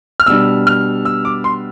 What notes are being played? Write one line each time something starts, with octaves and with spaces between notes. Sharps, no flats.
F6
B2 G3 D4 E6
F6
E6
D6
C6